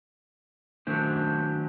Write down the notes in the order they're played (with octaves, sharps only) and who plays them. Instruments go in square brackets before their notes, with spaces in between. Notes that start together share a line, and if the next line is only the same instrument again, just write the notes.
[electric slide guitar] D#3 F#3 A3 C#4 D4 C5